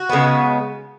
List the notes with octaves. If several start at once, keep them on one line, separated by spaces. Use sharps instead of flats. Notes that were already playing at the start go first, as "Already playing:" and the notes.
Already playing: F#4
C#3 G#3 B3